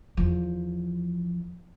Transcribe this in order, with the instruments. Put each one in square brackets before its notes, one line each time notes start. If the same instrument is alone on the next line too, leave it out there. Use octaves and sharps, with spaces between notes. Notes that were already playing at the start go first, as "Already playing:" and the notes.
[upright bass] E2 F3